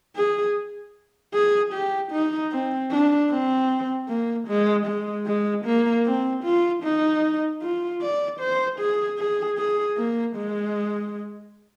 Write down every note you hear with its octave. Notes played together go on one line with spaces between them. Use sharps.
G#4
G#4
G4
D#4
C4
D4
C4
A#3
G#3
G#3
G#3
A#3
C4
F4
D#4
F4
D5
C5
G#4
G#4
G#4
A#3
G#3